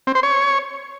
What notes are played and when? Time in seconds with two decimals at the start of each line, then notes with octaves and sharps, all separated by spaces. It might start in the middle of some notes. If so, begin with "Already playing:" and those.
0.07 C4
0.15 C5
0.23 C#5